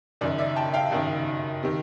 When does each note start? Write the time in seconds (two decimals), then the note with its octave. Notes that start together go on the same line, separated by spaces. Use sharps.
0.21 F#1 F#2 D#3 D5
0.38 D5 E5
0.56 G5 A5
0.74 F5 G5
0.91 F#1 F#2 D#3
1.63 C3 D#3